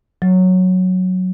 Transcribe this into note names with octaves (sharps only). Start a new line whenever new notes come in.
F#3